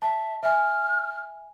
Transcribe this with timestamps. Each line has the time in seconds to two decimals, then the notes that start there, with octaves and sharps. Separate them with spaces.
0.02 E5 A5
0.43 E5 G#5 F6